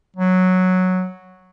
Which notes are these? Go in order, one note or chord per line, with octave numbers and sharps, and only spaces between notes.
F#3